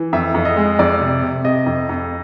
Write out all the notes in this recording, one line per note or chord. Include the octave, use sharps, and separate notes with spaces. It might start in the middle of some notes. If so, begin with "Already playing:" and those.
Already playing: E3
F2 E5
F2
D#5
G#3
F2 D5
C3
C3
C3 D#5
F2
F2